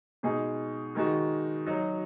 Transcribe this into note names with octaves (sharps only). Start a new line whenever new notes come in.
B2 G#3 D#4 G#4
D#3 G#3 D#4 F#4
F#3 D#4 F#4